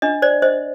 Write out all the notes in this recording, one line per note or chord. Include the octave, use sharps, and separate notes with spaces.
D4 D#5
C5 D5
C5 D#5